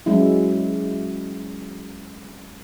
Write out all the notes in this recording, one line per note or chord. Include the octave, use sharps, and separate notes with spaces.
F#3 G#3 C#4 E4